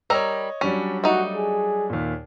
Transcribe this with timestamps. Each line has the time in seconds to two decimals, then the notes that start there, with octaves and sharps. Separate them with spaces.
0.10 G3 A#4 C#5 D#5 A#5 E6
0.61 F#3 G3 C#4 D4
1.04 A3 D#4 F#4
1.34 G#4
1.90 D#2 A#2